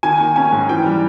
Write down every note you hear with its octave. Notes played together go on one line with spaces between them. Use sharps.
D#3 G#5
A#3
C#4 G#5
G#2
E3 G5
G3